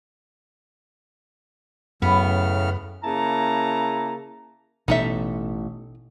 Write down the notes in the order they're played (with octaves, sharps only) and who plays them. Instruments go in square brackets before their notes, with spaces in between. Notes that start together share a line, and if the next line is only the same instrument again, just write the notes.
[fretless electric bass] F#2 [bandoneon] A2 C#3 F6 [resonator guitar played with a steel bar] B3
[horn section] C#3 A#3 E4 A5 A#5
[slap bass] A1 [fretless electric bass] B2 [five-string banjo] D#4 A4 E5